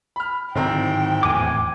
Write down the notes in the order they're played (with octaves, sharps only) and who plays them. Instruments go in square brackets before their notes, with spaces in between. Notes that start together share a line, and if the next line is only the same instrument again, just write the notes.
[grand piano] B5 F6
[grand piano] D1 C4 A#5 [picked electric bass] G#2 D3 D#3 [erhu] G5
[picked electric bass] D#1 E2 A2 [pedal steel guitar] G#5 D6